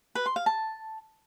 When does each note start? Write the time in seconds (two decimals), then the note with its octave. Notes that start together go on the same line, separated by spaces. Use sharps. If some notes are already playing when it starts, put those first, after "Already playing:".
0.15 B4
0.26 C6
0.36 F5
0.46 A5